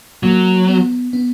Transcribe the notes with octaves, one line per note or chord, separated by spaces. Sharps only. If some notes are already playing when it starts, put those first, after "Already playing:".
F#3 A#3
B3
B3